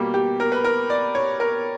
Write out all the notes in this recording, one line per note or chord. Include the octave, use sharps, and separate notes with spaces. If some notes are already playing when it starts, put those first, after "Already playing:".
Already playing: B2 G3 A#3 G4
G4
A#4
B4
A#4
D5
C#5
A#4